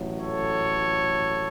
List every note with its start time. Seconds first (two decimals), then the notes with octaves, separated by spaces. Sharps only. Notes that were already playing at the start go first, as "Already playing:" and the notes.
Already playing: A1 A2 F#3
0.21 A4 C#5